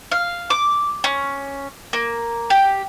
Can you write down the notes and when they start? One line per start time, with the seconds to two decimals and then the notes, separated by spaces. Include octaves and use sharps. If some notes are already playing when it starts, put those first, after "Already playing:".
0.11 F5
0.50 D6
1.04 C#4
1.93 A#3
2.50 G4